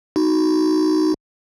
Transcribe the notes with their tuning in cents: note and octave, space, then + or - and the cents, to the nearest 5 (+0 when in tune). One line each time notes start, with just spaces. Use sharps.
D#4 +0 F#4 +0